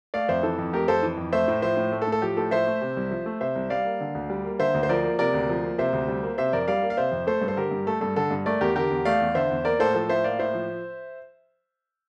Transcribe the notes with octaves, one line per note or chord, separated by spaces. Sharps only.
A3 D5 F5
F2 C5 E5
E3 A4
F2
A3 G4 A#4
F2 A4 C5
E3
F2
A3 C5 E5
A2
F3 C5 E5
A2
A3
A4
A2
A4
F3 G4
A2 A4
F3 C5 E5
A3
C3
C2
F3
A3
C3 C5 E5
C2
G3 D5 F5
A#3
D3
D2
G3
A#3
D3 C5 E5
D2
C5
F3 A#4 D5
A#3
C3 A#4 D5
D2
F3
A#3
C3 C5 E5
D2
G3
A#3
C3 C5 E5
F2 A#4 D5
G3 D5 F5
A#3
F5
C3 C5 E5
F2
A3 A4 C5
G2
C5
D3 G4 A#4
G2
A3 A4
G2 A4
D3 A4
G2
A3 A#4 D5
E2 G4 A#4
D3 G4 A#4
E2
A3 D5 F5
E2
D3 C5 E5
E2
A#3 A#4 D5
A2 A4 C5
F3 A4
A2 C5 E5
A#3 D5 F5
A2 C5 E5
F3